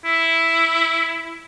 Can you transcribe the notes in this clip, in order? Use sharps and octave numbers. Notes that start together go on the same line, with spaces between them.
E4